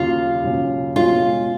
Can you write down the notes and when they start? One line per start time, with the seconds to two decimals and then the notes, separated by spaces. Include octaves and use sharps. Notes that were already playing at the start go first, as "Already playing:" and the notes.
Already playing: D#2 C#3 F#3 C#4 F4
0.44 D#2 C#3 F#3 C#4
0.95 B2 G#3 C#4 F4 G#4